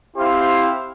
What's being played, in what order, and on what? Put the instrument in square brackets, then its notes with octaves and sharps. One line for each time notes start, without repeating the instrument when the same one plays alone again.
[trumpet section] C4 E4 G4 C5 F5